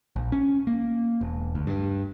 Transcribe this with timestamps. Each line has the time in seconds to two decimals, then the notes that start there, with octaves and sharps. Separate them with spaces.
0.16 A#1
0.32 C#4
0.67 A#3
1.21 E1
1.55 D2
1.67 G2